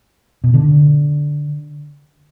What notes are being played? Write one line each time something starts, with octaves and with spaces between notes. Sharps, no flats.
B2
D3